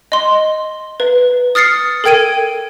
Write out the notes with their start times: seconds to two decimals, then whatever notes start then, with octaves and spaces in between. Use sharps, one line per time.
0.12 D#5 C6
1.00 B4
1.55 D#6 F6 A6 C7 C#7
2.04 A4 A#4 G5 G#6 D7 D#7